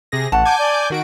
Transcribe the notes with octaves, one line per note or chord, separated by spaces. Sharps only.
C3 G#4 A#6
A1 F#5 A5
G#5 D6 G6
D5
D#3 F#4 D7